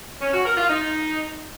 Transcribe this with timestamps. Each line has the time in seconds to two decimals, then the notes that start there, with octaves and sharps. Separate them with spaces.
0.22 C#4
0.34 F#4
0.46 A#4
0.58 F4
0.69 D#4